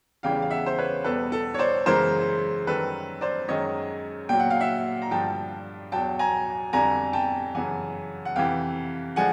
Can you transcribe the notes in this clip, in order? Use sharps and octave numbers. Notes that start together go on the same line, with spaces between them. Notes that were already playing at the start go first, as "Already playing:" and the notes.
E2 C#3 E3 G3 F5 G5
F5
E5 F#5
C5
B4 C#5
E2 B2 G3 A4 B4
A4
C#5
C5 D5
F#2 C#3 E3 G#3 A#4 C5
F#2 D#3 G3 A4 B4
C5 D5
F#2 D#3 G#3 C#5 D#5
A#2 F#3 G5
F#5
F5
E5 F#5
A#5
G2 D3 F3 G5 A5
E2 B2 F#3 G5 A5
G#5 A#5
F2 D3 G3 G#5 A#5
G5 A5
F#2 C#3 E3 F#5 G#5
F#5
F2 C3 E3 F5 G5
D3 F3 G#3 F#5 G#5